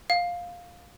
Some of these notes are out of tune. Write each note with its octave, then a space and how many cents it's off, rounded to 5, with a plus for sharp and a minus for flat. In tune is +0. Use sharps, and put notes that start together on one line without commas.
F5 +10